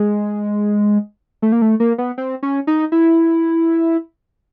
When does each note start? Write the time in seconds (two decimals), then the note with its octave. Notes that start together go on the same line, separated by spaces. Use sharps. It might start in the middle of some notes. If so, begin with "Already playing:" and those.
Already playing: G#3
1.42 A3
1.52 A#3
1.62 A3
1.80 A#3
1.98 B3
2.18 C4
2.43 C#4
2.67 D#4
2.92 E4